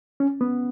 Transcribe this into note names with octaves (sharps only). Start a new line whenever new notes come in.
C#4
B3